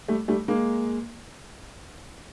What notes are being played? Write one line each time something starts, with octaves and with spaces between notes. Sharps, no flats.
G3 A3
G3 A3
G#3 A#3